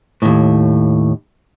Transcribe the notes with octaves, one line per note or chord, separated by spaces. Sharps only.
D#2 A2